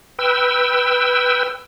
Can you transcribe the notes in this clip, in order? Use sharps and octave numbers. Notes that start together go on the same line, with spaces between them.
B4 G5 E6